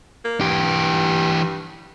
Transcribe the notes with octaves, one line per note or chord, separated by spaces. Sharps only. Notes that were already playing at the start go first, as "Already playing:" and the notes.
A#3
G2 E3 G4